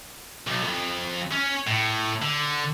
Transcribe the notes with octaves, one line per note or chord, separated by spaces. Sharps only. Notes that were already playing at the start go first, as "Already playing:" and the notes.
B1
F2
C#4
A2
D3